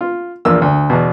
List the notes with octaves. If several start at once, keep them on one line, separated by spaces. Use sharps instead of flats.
F4
A#1 E2 A#3 F4 E6
D2
E2 B2